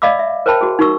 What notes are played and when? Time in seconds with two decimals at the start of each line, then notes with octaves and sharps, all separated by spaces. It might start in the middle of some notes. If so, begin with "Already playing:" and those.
0.02 D5 D#5 F5 B5 D6 E6
0.19 E5
0.46 A#4 C5 C#5 G5 A5 B5
0.61 F#4 G#4
0.79 D#4 F#4 A#4 C#6 E6